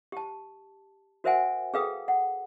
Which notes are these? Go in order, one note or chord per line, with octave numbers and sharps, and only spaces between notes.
G4 A5
F#4 A#4 C5 E5 F#5 G#5
G#4 A4 B4 F5 G5 D#6
F#5